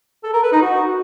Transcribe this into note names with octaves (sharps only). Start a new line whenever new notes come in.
A4
A#4
B4
D#4
F#4